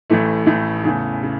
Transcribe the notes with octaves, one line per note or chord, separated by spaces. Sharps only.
A1 A2 E3 A3
A1 A2 E3 A3
E2 C#3 E3 A3
C#3